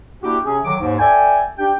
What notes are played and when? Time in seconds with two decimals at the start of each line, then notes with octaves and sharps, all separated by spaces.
0.23 A#3 D4 E4 F#4 G4
0.45 C3 C#4 G#4
0.65 D3 D#3 F#3 D6
0.80 D#2 G#2
0.99 A4 D5 E5 G5 G#5
1.58 D4 G4 G5